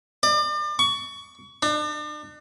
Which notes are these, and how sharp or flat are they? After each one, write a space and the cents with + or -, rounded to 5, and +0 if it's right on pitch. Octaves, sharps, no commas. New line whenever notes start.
D5 +35
C#6 +25
D4 +40